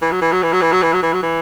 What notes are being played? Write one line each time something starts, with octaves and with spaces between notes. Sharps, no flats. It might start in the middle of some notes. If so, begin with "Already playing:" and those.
E3
F#3
E3
F#3
E3
F#3
E3
F#3
E3
F#3
E3
F#3
E3